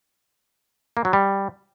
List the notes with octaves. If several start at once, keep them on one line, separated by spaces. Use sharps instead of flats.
A#3
F#3
G3